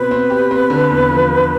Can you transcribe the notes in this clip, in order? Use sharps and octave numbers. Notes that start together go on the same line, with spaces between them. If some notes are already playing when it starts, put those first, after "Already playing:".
Already playing: B2 C4 B4
C4
G4
C4
D3
E2
F3
D3